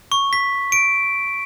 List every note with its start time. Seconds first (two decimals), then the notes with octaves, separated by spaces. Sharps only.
0.12 C#6
0.33 B6
0.72 D7